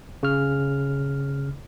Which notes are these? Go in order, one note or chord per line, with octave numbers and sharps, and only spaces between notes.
C#3 F6